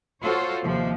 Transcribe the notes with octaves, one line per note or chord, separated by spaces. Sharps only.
F4 F#4 A4 C5 C#5
D#2 C3 F3